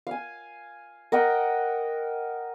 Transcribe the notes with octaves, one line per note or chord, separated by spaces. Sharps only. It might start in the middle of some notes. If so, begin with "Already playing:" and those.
F5 G#5
A#4 D#5 F#5 G5